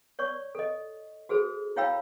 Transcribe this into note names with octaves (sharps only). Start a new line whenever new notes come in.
C#5 D5 C#6
A4 D#5
F#4 G#4 A4 C5
E4 C#5 F5 G5 B5 E6